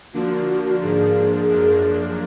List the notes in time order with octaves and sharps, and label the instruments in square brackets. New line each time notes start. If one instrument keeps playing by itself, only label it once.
[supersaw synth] D3 F3 A#3 D4 [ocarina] F#4
[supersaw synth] G#2 F3 A#3 D4 [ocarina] G#4
[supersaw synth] F#2 F3 A#3 D4